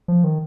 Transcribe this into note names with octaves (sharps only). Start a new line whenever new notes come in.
F3
D#3